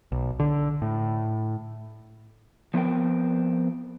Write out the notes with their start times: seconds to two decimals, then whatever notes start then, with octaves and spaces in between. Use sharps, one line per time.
0.12 B1
0.40 D3
0.82 A2
2.74 F3 B3 C4 A#4 G5